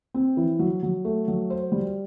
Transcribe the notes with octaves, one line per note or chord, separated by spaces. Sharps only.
C4
E3
F#3
F#3
A3
F#3
C5
G3